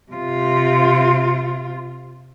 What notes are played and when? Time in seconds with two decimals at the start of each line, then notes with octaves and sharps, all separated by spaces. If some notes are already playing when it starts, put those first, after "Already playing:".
0.13 C3 F4